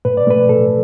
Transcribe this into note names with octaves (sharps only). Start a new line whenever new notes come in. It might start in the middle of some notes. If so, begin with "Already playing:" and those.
A2 B4
D5
A3 B4
A2 A4